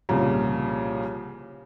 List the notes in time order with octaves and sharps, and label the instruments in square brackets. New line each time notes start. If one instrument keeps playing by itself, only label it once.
[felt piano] C2 A#2 C#3 F3